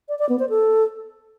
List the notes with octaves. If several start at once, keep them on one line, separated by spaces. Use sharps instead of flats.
D5
D5
B3
C5
A4